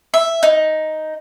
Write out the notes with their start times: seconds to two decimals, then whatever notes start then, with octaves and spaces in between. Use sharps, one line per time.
0.14 E5
0.43 D#4